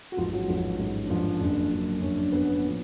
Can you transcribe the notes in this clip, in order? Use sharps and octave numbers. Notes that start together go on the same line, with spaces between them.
F#4
A1 G#2 F3 F4
F#3 F#4
A1 G#2 F3
A1 G#2 F3
D4
A1 G#2 F3 F4
F#1 F#2 D3 D4
F#1 F#2 D3
F#1 F#2 D3 C#4
D4
F#1 F#2 D3 B3 B4
A2 F3